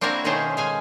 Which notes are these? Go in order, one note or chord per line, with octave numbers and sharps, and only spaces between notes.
A#3 C4 D4 E4 F#4 A#4
B2 D#3 A3 C#4 G#4 C5
G#3 F5 G#5